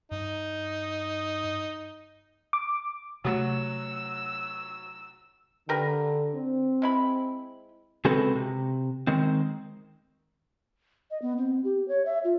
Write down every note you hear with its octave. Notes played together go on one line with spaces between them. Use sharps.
G2 D#4
D6
C3 F#3 A3 F#4 E6
D3 G4 A#4 B4
C4
G#3 E4 B5
C#3 G#3 C4 F#4 A4 B4
C3
D#3 G#3 C4
D#5
B3
C4
G4
C#5
E5
F4